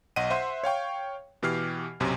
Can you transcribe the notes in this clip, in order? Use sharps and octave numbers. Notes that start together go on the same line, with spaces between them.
B1 D#5 F#5 D#7
C5 E5 F#5 C6
C#5 F5 G5 C#6
B2 E3 G4 F6 C7
B1 F#2 C3